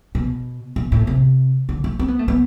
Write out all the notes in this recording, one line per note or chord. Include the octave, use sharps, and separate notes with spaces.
B2
B2
A2
C3
D3
A3
C4
B3
A3
B3